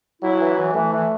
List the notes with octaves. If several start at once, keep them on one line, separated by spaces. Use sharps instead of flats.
F#3 E4
E3
E3
E3 A3
E3